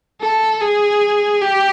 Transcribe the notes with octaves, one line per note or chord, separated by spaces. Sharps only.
A4
G#4
G4